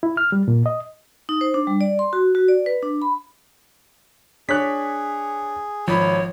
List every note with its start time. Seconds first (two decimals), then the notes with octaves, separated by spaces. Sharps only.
0.03 E4
0.17 F6
0.32 G3
0.48 A#2
0.66 D#5
1.29 D#4
1.41 C5
1.54 D4
1.67 G3
1.81 D5
1.99 C6
2.13 F#4
2.35 F#4
2.48 D5
2.66 B4
2.82 D4
3.02 B5
4.49 D4 G#4 C#5 F#6 B6
5.87 G#1 F3 C#5 B5